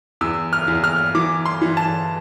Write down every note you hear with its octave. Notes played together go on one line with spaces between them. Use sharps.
E2 E6
F6
E2
F6
E3 D6
C6
E3
A5